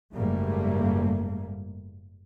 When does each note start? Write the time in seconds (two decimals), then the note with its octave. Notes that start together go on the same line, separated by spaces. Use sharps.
0.16 F#1 G#2 G3 A3 A#3